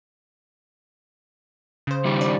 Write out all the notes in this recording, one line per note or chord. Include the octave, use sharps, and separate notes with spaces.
C#3 C5
G2 D#3 G3
D5